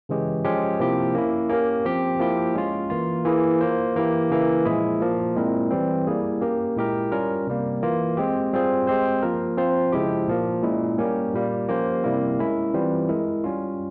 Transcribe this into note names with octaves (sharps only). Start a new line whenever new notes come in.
C#3 E3 G#3 C#4 G4
F3 G#3 C#4 G4
C3 F3 A#3 E4 G4
A#3 C#4 E4
A#3 C#4 G4 A#4
F3 C4 G4
F3 A#3 E4 G4
G#3 C#4 F4
E3 A#3 F4
E3 A#3 E4 G#4
A#3 F4 C5
E3 A#3 E4 G4
C#3 E3 A#3 E4
A#2 F3 G#3 E4 G#4
A#2 F3 A#3
A#2 G#3 C4 E4 A#4
E3 G3 C4
G3 A#3 E4 G#4
A#3 C#4 G4 A#4
A#2 G#3 E4 G4 A#4
G3 C#4 F4 A#4
C3 G3 A#3
E3 A#3 F4
G#3 C4 G4
G3 C4 F4 G#4 C5
G#3 C4 G4 C5
F3 A#3 F4 A#4
F3 C4 F4 C5
C#3 F3 G#3 E4 G4
A#2 F3 A#3
A#2 G#3 C#4 E4
G3 A#3 C#4 G4 A#4
A#2 G3 A#3
F3 A#3 C#4 G4 C5
C3 G3 A#3 E4
G#3 C#4 E4 A#4
E3 G3 C4 F4
G#3 E4 A#4
G3 C#4 F4